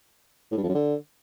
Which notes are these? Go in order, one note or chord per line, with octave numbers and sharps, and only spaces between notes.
A2
G2
F2
F#2
D3